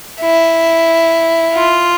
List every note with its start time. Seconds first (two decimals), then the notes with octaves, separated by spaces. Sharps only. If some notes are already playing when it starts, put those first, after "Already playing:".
0.21 E4
1.54 F4